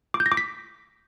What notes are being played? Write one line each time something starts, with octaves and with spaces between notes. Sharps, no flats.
D6
G6
A#6
D6
B6